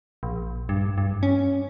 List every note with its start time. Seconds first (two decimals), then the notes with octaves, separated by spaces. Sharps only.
0.23 A#1
0.69 G2
0.98 G2
1.23 C#4